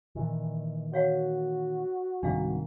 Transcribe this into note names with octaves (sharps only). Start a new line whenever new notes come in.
A#2 D#3 E3
F#4 C#5 F5 F#5
C2 G#2 D#3 D4 F5